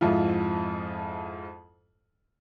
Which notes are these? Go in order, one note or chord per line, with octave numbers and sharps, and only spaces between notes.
F2 G#2 F3 E4 F4